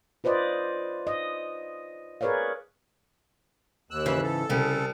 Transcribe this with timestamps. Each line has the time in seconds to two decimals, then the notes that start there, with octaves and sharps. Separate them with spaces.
0.24 F4 B4 C5 D5 D#5
1.07 D#5
2.21 G#4 A#4 B4 C#5 D5 F5
3.91 D#2 E6 F#6
4.06 G#2 C#3 E3
4.23 A4
4.50 C2 C#3